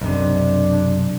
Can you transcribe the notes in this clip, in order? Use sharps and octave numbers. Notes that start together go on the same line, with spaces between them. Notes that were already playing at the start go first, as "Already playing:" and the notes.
B1 F#2 C3 D4